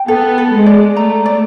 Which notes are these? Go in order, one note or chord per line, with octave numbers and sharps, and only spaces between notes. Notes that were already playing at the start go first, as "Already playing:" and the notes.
Already playing: G5
B3 A4
A4
G#3
D5
A3 A#5
D5